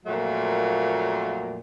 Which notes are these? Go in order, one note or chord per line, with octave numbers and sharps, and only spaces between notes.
F2 A#2 F#3 A3 A#3